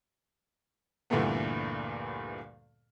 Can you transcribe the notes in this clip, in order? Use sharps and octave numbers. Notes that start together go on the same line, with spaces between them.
D2 G2 A#2 E3 A3 B3